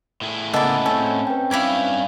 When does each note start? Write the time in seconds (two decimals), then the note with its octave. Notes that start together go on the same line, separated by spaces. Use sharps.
0.21 A2 E4 G#4
0.54 C#3 A#3 B3 A4 D5 D#5 F#5 B5
0.86 C4 C#4 A4
1.27 B4 G5
1.51 G2 E4 F5 B5 D6 G#6